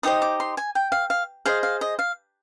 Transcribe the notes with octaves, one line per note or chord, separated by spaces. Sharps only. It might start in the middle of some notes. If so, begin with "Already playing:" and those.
D#4 G4 C5 D#5 D#6
D6
C6
G#5
G5
F5
F5
G#4 C5 D#5 F5
F5
D#5
F5